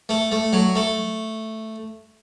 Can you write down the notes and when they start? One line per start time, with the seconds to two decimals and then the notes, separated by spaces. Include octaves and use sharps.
0.09 A3
0.32 A3
0.53 F#3
0.76 A3